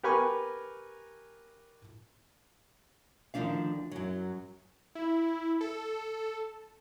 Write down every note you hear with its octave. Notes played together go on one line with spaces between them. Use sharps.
G4 A#4 B4 G#5 C#6
D2 G#2 D#3 F3 D4 F5
F#2 F#3
E4
A4